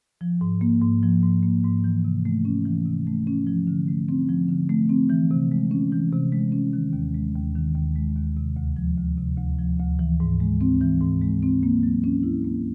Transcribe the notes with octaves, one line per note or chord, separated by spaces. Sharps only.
F3
G#2
A#3
G#2
F3
G#2
A#3
G#2
E3
C3
A3
C#4
E3
C3
A3
C#4
F3
D3
A3
C4
F3
D3
A3
C4
E3
C3
G#3
C#4
E3
C3
G#3
C#4
D#3
D#2
G#3
D#2
D#3
D#2
G#3
D#2
C3
D2
F3
D2
C3
D2
F3
D2
E3
G#2
G#3
C4
E3
G#2
G#3
C4
A#3
F#3
C#4
E4
A#3